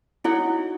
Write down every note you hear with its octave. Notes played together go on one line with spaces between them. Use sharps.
D#4 E4 F#4 C#5 F#5